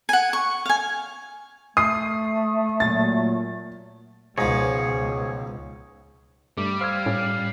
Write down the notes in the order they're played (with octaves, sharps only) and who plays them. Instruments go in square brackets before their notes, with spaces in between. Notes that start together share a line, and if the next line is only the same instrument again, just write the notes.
[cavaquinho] F#5 G#5
C#6
F5 G#5
[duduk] A3 [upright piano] D#6 C7
[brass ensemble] A#2 F#3 [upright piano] A6
[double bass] C#2 B2 [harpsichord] G#2 F3 [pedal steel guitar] G#4 C#5
[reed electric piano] G2 A3 D6 [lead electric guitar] G3
[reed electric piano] C5 E6 G#6 [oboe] F5
[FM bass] A2 [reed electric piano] C#4